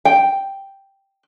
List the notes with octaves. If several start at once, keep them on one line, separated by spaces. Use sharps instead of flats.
G5